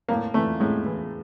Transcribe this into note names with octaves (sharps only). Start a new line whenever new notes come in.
A2 A#3
E3 A3
A2 G#3
E3